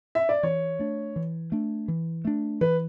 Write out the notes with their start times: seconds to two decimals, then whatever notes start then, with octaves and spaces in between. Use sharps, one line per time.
0.15 E5
0.29 D5
0.43 E3 C#5
0.79 A3 D4
1.16 E3
1.52 A3 D4
1.88 E3
2.25 A3 D4
2.61 E3 B4